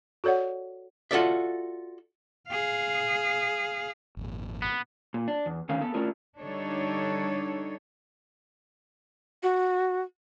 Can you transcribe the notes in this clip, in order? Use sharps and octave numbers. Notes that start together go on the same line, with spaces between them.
F#4 A4 C#5 D5 F#5
F4 F#4 A4 D5 E5
G#4 F5
G#1 F2 A#2
B3
A#2
D4
E2
E2 D3 D#3 A3 C#4 F5
B3 A4
A3 C#4 D4 E4 F4 A#4
D3 G3 D4 D#4 A4 C#5
F#4